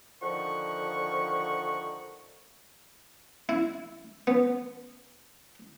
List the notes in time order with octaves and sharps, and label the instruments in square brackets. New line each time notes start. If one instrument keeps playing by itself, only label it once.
[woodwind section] D3 D#3 F3 F#5 C#6
[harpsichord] E4
B3